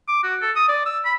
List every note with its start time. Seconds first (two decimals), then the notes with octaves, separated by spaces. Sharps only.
0.08 D6
0.24 F#4
0.42 A4
0.56 D#6
0.68 D5
0.86 E6
1.05 B5